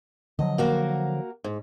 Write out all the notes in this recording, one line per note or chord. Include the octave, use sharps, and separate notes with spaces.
D3 F3 F#3 D#5
A#3 F#4 A#4
G#2